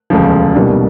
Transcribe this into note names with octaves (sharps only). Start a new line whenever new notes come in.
E1 D2 C#3 F3
C2 B2 G3 A#3 D4